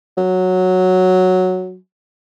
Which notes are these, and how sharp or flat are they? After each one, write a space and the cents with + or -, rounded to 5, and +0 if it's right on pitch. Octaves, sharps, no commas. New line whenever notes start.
F#3 -5